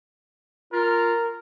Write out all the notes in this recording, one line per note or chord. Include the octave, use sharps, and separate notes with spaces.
F4 A#4